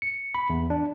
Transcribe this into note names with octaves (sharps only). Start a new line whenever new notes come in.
C#7
B5
E2
D4